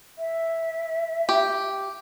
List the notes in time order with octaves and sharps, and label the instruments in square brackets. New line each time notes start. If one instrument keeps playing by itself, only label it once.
[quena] E5
[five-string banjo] G4